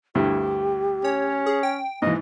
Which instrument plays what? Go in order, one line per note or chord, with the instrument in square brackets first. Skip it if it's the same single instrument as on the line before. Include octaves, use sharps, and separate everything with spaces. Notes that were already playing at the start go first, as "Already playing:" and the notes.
[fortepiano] D2 G2 E4 [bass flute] G4
[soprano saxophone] C#4 [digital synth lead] C#5
[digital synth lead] G#4
G5
[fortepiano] G#2 E3 [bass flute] A#3 [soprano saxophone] D#5